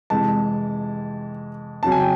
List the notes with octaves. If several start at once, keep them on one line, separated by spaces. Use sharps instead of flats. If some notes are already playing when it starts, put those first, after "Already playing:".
F2 C3 E3 G#3 A5
F2 C#3 F#3 A5
G#5
G5